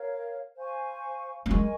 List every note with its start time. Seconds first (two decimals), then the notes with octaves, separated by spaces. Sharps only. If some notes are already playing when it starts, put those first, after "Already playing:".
Already playing: A#4 C#5 F5
0.56 C5 F5 G#5 C#6
1.46 A#3
1.50 G#3 A#4 D#5 G#5 C#6